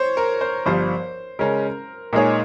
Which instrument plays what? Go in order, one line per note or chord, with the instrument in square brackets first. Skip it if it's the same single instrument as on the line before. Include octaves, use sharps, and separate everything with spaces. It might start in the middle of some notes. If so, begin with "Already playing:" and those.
Already playing: [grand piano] C5 C#5
A#4
C5
[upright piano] G1 G2 F3 [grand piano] C5
[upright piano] C#3 G#3 C#4 [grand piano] A#4
[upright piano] A#2 G#3 D#4 G#4 C#5 [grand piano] A#4